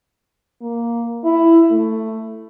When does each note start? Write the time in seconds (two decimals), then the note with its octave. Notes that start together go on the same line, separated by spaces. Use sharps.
0.61 A#3
1.24 E4
1.71 A3